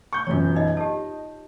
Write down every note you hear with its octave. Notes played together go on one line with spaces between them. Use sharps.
C#6 G6
E1 F#2 F4 C#5
D#4 D#5
G4 D#5 A5